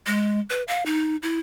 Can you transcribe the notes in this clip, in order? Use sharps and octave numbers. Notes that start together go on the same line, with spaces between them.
G#3
B4
F5
D#4
E4